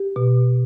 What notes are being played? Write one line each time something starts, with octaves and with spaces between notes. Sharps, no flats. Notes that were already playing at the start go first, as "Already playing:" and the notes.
Already playing: G4
B2